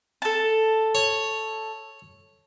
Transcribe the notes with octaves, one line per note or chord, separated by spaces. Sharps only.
A4 A5
C#5